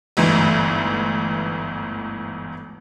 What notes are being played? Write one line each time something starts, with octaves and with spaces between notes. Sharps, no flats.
G1 D2 G#2 E3